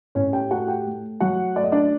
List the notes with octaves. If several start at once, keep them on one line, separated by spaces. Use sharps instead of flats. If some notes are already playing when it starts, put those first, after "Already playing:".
A2 C#4 C#5
G4 G5
A3 F#4 F#5
G4 G5
A3
F#3 F#4 F#5
A3 D5
D#5
D4 D5